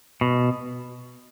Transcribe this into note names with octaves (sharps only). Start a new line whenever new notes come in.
B2